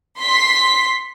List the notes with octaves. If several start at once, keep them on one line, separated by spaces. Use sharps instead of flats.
C6 B6